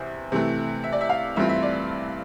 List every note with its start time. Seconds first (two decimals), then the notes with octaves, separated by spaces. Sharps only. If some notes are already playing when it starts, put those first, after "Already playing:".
Already playing: E2 C3 E3 C5 E5
0.32 C3 E3 A3
0.84 E5
0.93 D5
1.01 E5
1.09 F5
1.36 G2 E3 A3 C4 F4 E5
1.49 E5
1.63 D5